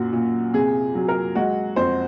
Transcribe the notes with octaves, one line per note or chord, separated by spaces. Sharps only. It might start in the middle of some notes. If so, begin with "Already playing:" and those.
Already playing: F#2 A#2 F#4
A#2
C3 G#4
F#3
A#4
G#3 F#4
F2 C5